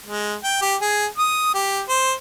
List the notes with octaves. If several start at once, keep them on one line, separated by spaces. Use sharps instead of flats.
G#3
G5
G4
G#4
D#6
G4
C5